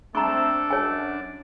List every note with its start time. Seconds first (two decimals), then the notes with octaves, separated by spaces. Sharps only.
0.15 A3 C4 D4 A4 A#5 C#6
0.70 F#2 C#5 G#5